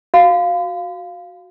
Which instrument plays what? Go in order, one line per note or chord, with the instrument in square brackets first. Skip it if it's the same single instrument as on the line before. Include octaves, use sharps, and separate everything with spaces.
[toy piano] F#4 F5